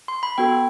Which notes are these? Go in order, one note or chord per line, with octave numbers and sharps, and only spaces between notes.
C6
B5
B3 F#4 A4 G5